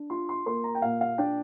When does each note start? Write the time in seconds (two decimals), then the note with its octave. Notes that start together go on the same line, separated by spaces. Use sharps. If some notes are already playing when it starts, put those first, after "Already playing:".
Already playing: D4
0.10 F4 C6
0.29 C6
0.46 A#3 C6
0.64 A#5
0.75 G5
0.82 A#2 F5
1.01 F5
1.18 D4 G5